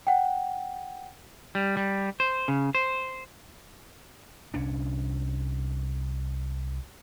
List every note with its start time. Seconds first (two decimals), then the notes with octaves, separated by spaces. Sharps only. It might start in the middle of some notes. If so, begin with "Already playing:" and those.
0.07 F#5 G5
1.55 G3
1.77 G3
2.20 C5
2.48 C#3
2.75 C5
4.54 C2 C#4 D4